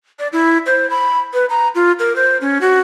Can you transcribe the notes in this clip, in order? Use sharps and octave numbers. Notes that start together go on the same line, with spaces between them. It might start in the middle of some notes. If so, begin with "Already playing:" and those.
D5
E4
C5
B5
B4
A#5
F4
A#4
C5
C#4
F#4